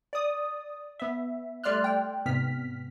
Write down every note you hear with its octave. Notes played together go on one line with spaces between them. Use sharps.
D5 D#6
B3 E5
G3 A3 D5 C6 F6 F#6
G5
G#2 C3 B3 F6 B6